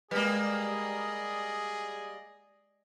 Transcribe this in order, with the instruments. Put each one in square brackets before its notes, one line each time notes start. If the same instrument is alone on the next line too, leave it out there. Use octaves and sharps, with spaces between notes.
[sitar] G3 A#3 [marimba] G#3 B4 [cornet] G#4 [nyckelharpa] D5 D#5